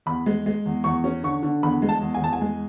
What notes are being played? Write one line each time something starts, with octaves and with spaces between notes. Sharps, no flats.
E2 B5
G#3
G#3
E2
E2 C#6
C#4
D3 C#6
D3
E2 B5
G#3
A5
E2
G#5
E2 A5
G#5
G#3